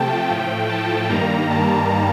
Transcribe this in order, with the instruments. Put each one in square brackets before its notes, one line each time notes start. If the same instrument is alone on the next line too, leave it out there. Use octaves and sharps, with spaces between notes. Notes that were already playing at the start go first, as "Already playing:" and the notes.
Already playing: [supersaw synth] C3 F3 A3 G5 A5
A2 F3 A3 G5
A5
G2 D#3 G3 A#3 A#5
A5